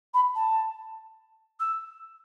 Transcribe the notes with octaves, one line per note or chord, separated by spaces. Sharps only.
B5
A5
E6